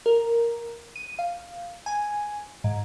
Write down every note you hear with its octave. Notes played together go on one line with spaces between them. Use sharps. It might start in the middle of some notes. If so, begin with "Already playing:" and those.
A#4
D#7
F5
G#5
G#2